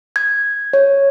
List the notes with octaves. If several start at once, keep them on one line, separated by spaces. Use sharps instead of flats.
G#6
C#5